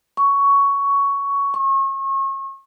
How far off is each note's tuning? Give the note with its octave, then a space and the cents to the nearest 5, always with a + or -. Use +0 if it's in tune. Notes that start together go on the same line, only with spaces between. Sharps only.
C#6 +10
C#6 -35